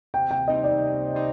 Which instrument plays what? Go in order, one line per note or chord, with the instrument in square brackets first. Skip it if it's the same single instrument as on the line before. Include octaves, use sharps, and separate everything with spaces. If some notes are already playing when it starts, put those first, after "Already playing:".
[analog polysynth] C3 [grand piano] G5
[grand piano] G5
[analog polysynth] G3 C4 D#4 [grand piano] D#5
[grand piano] D5
[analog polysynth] C3
G3 C4 D#4